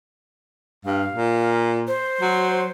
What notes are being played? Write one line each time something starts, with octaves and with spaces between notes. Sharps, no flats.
G2 F5
A#2
C5
F#3